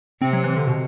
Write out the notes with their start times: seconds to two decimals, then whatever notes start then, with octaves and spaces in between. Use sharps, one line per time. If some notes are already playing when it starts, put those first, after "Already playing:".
0.21 C3 C4
0.33 F#3
0.44 E3
0.56 D3
0.67 B2